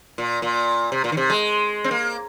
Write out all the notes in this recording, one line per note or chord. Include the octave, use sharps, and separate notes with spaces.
A#2
A#2
C3
A#2
D#3
C3
G#3
C4
A#3